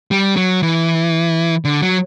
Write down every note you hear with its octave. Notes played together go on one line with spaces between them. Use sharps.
G3
F#3
E3
D3
F#3